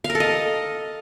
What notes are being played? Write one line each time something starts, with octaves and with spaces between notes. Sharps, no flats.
F5
A#4
A4
D#5